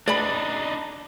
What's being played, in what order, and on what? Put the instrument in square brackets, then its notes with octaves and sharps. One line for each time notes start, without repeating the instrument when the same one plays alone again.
[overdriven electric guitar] D4 D#4 [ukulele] D5 B5